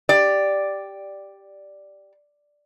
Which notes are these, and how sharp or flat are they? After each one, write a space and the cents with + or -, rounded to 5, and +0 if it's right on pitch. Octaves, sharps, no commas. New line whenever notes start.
G4 +0 D5 +0